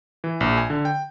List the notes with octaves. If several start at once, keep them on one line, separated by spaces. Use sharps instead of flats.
E3
A#1
G#5
D3
G5